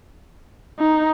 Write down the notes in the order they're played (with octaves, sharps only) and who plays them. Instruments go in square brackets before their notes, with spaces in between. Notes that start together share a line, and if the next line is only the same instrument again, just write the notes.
[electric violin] D#4